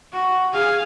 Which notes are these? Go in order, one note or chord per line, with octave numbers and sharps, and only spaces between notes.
F#4
G#4 F5